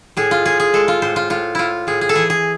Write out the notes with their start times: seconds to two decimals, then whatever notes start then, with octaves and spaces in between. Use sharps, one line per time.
0.17 A2 G#4
0.31 F4
0.45 A2 G#4
0.60 G#4
0.73 G#3 A4
0.88 F4
1.02 A2 C5
1.16 F4
1.30 A2 F4
1.55 A2 E4 F4
1.87 A2 G#4
2.01 G#4
2.09 A4
2.15 E3 G#4
2.30 G#4